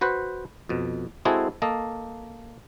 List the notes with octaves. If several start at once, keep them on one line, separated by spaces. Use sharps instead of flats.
F#4 B4 C5 F#5
F2 B2
G#3 C4 E4 F#4 G#4 A4
A#3 A4 D#5